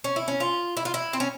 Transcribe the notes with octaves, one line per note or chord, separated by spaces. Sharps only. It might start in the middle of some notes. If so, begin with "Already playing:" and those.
C#4
E4
C#4
F4
E4
F4
E4
C4
C#4